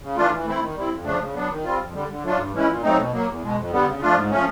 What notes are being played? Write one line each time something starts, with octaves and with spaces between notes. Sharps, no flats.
C#3
E3 A3 D4 F4
E3
A3 C4 E4
D#3
G3 C4 E4
F2
C#3 F3 A3 D4
C#3
F#3 B3 D4
D#3
G3 C4 F4
F2
D3 G3
D3
F#3 A3 D4 F4
G2
E3 G#3 C#4 E4
A#2
F#3 A3 C4 D#4
B2
F#3 A#3
E2
B2 G#3
F2
D3 G3 B3
C#3
F3 A3 D4 F4
G#2
F3 A3 C#4